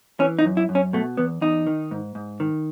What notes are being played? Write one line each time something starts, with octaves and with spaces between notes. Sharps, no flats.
E3 C#4
D#4
F#2
E4
F#2
C#4
B2 A3
E2 B3
E2 D#4
D#3
G#2
G#2
D#3